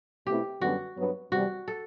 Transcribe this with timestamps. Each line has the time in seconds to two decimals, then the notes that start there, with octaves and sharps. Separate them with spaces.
0.27 B2 A3 C4 E4 G4
0.61 F#2 D3 G3 B3 F#4
0.97 G2 F#3 B3
1.32 E2 C3 G3 F#4
1.68 A4